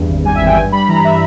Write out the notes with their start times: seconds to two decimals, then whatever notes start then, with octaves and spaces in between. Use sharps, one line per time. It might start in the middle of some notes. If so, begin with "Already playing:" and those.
Already playing: E2 G2
0.09 G#1
0.25 G3 G#5
0.35 E5
0.41 G#1 G5
0.56 G2 G#5
0.72 G3 B5
0.88 E3 A#5
1.05 E5